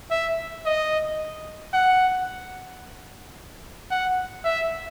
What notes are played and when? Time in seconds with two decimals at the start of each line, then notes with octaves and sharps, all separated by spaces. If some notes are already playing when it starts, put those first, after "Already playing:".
0.11 E5
0.66 D#5
1.74 F#5
3.91 F#5
4.44 E5